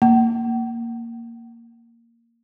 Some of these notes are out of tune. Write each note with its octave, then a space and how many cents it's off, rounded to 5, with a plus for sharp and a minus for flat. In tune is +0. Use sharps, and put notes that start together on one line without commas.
A#3 -10